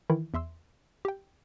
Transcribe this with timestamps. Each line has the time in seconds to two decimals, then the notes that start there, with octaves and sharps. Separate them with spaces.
0.10 D#3 E3 E4
0.34 E2 E5 C6 E6
1.05 G4 G5